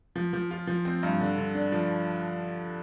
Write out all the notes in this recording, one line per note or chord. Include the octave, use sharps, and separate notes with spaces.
F3
F3
F4
F3
C4
G2
D3
D3
D4
F3